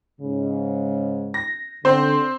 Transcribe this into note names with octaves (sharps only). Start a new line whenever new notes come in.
G#2 C#3
A#6
D3 C4 C5